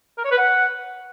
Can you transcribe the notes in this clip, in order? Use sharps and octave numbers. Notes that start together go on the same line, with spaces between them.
A#4
C#5
B4
F#5